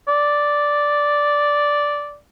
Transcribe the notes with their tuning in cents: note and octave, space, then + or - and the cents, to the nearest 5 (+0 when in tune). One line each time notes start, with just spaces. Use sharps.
D5 -5